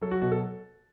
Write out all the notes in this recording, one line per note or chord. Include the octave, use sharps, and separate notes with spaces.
F#3 A4
F#4
B2 F#4
A4